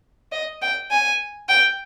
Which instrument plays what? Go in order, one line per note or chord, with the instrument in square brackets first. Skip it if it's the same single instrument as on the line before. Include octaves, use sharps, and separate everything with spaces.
[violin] D#5
G5
G#5
G5